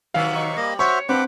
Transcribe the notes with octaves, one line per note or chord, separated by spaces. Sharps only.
C3 D#3 F#3 F5
D#4 C#6
G3 A#3 D#5
F#4 C5 C#5 E5 C#6
G2 C4 B4 F#5 D6